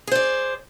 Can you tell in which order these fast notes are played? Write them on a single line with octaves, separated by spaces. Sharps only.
G#4 C5 D5